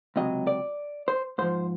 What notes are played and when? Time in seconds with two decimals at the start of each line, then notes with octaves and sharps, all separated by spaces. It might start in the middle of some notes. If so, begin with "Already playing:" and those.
0.16 C#2 C3 F#3 D#5
0.47 D5
1.08 C5
1.38 G#2 F3 C5